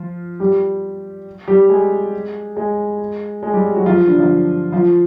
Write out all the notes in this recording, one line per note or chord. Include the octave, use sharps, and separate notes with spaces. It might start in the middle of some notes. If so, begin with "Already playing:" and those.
Already playing: F3 F4
G3 G4
G3 G4
G#3 G#4
G#3 G#4
G#3 G#4
G3 G4
F#3 F#4
F3 F4
D3 D4
F3 F4
F3 F4